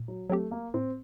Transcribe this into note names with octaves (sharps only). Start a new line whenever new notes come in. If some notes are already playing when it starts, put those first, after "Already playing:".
Already playing: A#2
F#3
F#3 A3 C4 G4
A#3
A2 C4